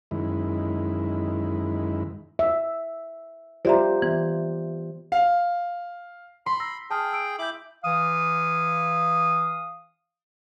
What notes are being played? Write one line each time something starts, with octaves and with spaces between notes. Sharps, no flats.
F#2 D#3 G#3 E4
E5
F4 G4 C5 D5 E5 A#5
E3 B3
F5
B5 C6
A#5 E6 A#6
G#4 G5 A5 D#6 F6
E6 D7
E4 D6 G6 F#7
E3 F5 D#6